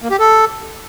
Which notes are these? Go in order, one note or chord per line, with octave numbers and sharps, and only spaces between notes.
A#3
G4
A4